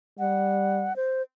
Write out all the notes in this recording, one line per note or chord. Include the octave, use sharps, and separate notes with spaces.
G3 F#5
C5